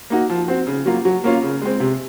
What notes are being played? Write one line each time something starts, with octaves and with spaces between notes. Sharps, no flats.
A#3 D#4 F#4
F3
C4 F#4
C#3
F#3 A#3 F4
F#3
A#3 C#4 F4
C#3
G#3 C4
C3